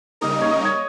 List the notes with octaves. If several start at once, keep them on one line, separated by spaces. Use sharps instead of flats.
C#3 G3 A#3 D#4 A#4 D#5
D#5
C#5
D#5
C#5